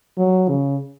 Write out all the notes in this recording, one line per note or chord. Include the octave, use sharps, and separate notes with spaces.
F#3
C#3